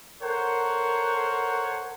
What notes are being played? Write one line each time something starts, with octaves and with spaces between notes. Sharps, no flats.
A4 A#4 C5 C#5 F#5